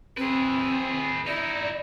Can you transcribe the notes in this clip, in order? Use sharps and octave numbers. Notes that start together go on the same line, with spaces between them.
C4 G#4 B4
D#4 E4 D5